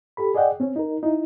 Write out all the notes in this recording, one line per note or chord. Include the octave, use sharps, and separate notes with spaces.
G4 A4 B5
G#4 D5 D#5 F#5 G5
C4 C#4
D#4 A#4
D#4 E4